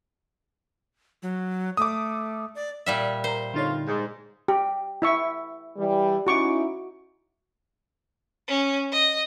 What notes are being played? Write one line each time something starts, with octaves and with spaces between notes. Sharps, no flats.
F#3
A3 D6 D#6
D5
A#2 G3 E5
A#4 C5 A#5
F2 D3 D#4 F4 C#5
G#2
G4
E4 E5 C#6
E3 G3
C#4 D#4 E4 F#4 C#6 D6
C#4
D#5